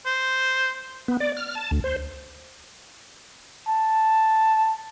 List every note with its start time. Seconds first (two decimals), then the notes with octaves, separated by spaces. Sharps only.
0.06 C5
1.08 B3
1.20 D5
1.37 F6
1.55 A5
1.71 D2
1.84 C5
3.68 A5